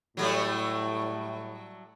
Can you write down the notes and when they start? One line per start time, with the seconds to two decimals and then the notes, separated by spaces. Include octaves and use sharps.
0.17 A2 F#3 G3 A3